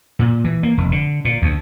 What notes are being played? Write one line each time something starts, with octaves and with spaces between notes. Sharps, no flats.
A#2
E3
A#3
F1
D3
A#2
D2